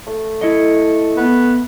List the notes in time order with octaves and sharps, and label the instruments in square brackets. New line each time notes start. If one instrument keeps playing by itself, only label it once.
[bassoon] A3
[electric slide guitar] E4 A4 D#5
[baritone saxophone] B3